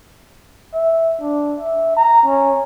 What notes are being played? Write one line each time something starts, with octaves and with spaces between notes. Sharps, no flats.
E5
D4
E5
A#5
C#4